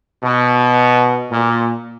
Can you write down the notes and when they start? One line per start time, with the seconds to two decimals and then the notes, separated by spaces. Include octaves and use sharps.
0.23 B2
1.31 A#2